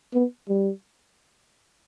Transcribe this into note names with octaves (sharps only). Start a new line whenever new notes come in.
B3
G3